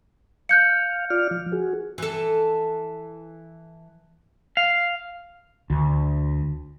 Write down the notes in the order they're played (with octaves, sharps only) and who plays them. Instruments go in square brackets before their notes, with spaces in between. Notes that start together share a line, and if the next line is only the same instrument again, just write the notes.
[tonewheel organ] F5 [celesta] F#6 G6 C#7
[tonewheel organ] F4 D5 F6
F3
F#4 G#4
[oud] E3 A4
[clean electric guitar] F5
[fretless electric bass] D2